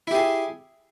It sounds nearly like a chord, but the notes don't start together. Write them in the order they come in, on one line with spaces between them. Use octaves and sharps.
E4 G4 G#4